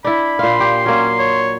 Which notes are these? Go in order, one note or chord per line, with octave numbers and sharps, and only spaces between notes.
D4 E4 B5
A#2 F5 C6
G4
F#3 A#3 C#4
C#5